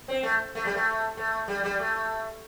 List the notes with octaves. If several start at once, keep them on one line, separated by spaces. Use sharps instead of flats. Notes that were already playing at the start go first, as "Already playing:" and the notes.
C4
A3
A3
G3
A3
A3
G3
G3
A3